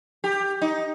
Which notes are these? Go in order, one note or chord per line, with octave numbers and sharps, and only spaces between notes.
G4
D#4